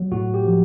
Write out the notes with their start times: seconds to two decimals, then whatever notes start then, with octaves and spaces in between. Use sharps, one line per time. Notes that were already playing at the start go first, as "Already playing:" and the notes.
Already playing: F#3
0.12 A2 F#4
0.34 G4
0.46 F3